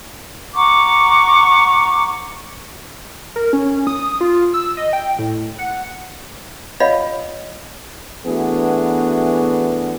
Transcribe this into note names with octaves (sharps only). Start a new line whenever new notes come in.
F#5 A#5 C#6 D6
A#4
C#4
D#6
F4
E6
D#5
G5
A2
F#5
F4 C#5 D#5 F5 F#5 B5
E3 A3 B3 D4 F#4 G#4